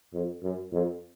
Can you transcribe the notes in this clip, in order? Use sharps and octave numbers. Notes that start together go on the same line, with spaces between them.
F2
F#2
F2